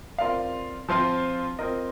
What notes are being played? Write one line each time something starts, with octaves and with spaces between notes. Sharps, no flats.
C4 F4 A#4 D5 F5
F3 C4 F4 C5
C4 F4 A#4 D#5